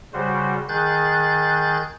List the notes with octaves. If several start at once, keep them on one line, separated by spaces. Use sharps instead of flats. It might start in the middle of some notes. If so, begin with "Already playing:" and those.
C#3 G3 F#4 C5
D#3 G#4 F#6 G6 A6